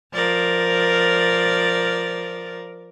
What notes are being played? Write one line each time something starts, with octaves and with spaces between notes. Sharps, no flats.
F3 A#4 D5